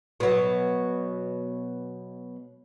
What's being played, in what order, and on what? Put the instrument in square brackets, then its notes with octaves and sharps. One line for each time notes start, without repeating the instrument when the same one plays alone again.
[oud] B2 F#3